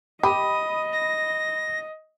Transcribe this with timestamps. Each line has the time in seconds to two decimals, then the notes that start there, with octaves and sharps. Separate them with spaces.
0.23 G4 D#5 B5 D#6
0.92 A#6